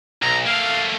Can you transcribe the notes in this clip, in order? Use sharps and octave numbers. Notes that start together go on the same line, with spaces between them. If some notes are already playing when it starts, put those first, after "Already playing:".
B1 A#5
A3 A#3 F5